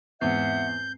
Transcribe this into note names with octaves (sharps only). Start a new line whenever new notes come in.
E2 G#2 C4 E5 F#5 G6 C7